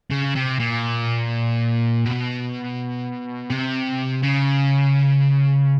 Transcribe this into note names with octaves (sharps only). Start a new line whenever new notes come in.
C#3
C3
A#2
B2
C3
C#3